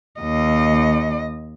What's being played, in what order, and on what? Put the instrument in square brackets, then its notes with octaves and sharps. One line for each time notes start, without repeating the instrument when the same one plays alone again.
[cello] D#2 D#5